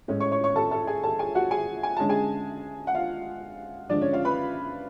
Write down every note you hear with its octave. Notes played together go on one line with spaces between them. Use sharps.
A2 G#3 C#4
C#5 C#6
C#5 C#6
C#5 C#6
A4 A5
A4 A5
G#4 G#5
A4 A5
G#4 G#5
F#4 F#5
G#4 G#5
G#5
D3 G#3 C#4 A5
G#4 G#5
F#5
F4 F5
D3 F3 G#3 D4 D5
C#4 C#5
F4 F5
B4 B5